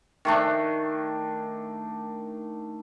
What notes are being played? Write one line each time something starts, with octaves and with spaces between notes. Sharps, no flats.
D#3 A3 D4